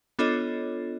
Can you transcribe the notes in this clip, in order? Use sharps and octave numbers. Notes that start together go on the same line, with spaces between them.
B3 D4 F4 A4 C#5 D#5